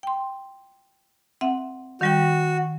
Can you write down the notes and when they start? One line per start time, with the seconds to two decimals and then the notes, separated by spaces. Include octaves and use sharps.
0.03 G5 C6
1.41 C4 E5 F#5
2.01 D#3 G3 F#4 G5